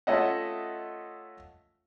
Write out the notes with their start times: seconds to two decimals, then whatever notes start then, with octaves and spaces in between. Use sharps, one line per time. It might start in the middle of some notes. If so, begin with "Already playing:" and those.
0.07 A3 C#4 F4 D#5 E5 F#5